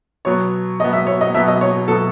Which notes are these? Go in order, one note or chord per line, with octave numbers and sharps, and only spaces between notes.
B2 F#3 B3 C#5
B2 F#3 B3 D#5
E5
C#5
D#5
B2 F#3 B3 E5
D#5
C#5
B2 F#3 B3 A4